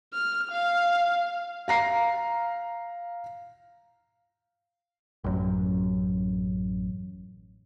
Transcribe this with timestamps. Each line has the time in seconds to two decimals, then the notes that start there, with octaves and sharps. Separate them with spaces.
0.13 F6
0.52 F5
1.68 F5 A#5 C7
5.24 A1 F#2